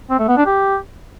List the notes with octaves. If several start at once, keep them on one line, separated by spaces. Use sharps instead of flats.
C4
A3
B3
D4
G4